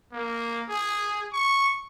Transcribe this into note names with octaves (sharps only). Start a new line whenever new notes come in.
A#3
G#4
C#6